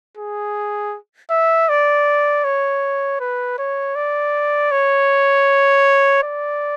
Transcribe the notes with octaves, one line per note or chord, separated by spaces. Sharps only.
G#4
E5
D5
C#5
B4
C#5
D5
C#5
D5